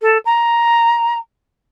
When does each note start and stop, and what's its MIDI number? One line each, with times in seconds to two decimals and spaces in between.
0.01 0.17 69
0.25 1.17 82